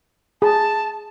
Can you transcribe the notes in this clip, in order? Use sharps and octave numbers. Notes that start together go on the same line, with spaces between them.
G#4 A5